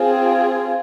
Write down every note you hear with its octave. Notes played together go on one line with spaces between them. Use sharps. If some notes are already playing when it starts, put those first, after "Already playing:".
Already playing: C4 F4 G#4